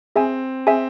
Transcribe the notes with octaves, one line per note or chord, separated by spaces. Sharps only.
C4 G#4 E5 G#5
C4 G#4 E5 G#5